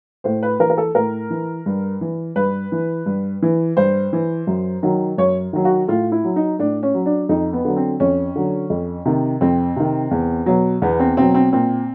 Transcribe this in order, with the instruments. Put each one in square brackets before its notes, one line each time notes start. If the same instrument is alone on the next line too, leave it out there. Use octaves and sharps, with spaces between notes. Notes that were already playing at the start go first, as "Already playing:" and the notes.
[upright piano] A2 C5
B4
E3 A#4
A#4
A4
A2 A#4
E3
G2
E3
G2 B4
E3
G2
E3
G2 C5
E3
F#2
D#3 F#3
F#2 C#5
D#3 F#3
F#4
A2 F4
E4
F#3
D#4
A2 D4
C#4
F#3
D4
F2 D#4
B3
D3 F#3
C4
F2 C#4
D3 F#3
F2
C3 D#3
F2 C4
C3 D#3
E2
B2 F#3
E2 B3
C4
B2 F#3 C4
C4
A#2 C4